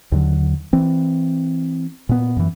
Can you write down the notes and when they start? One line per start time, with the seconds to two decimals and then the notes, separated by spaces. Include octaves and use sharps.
0.12 D#2 D3 F#3
0.73 E3 C4
2.09 A#2 B3
2.37 F#2 E3